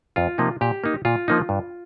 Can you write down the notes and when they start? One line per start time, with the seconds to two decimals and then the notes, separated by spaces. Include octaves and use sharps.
0.16 F2 F4
0.38 C3 F3 A#3 D#4
0.61 A#2 G4
0.84 A#3 D#4
1.05 A#2 F4
1.28 F3 A#3 D#4
1.49 G2